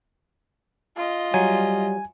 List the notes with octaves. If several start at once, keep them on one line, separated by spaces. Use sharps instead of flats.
F4 D#5
F#3 G3 G#5